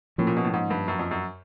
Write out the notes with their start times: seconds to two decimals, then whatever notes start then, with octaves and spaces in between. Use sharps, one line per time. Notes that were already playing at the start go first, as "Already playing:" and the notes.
0.18 A2 F3 A#3 C#4
0.27 A#2
0.37 B2
0.44 A2
0.54 G#2
0.70 G2
0.88 F#2
0.99 F2
1.11 F#2